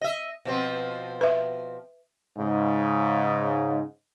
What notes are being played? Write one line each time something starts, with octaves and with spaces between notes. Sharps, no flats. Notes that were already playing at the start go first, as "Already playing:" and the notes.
D#5 E5
B2 F3 C4
B4 E5
G#2 C#3